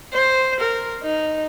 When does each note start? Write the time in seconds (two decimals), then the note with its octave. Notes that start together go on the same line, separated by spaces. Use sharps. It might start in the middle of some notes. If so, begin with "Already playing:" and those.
0.13 C5
0.60 A#4
1.03 D#4